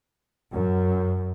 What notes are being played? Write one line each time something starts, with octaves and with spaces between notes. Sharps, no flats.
F#2